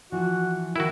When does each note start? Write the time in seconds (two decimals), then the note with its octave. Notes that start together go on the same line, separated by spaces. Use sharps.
0.12 E3 F3 F#4
0.76 D#3 E4 F#4